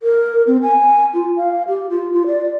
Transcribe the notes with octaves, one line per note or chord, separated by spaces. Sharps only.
A#4
C4
G#5
F4
F5
G4
F4
F4
D5